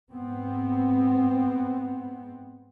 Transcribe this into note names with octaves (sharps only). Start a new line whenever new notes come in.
G#2 B3 C4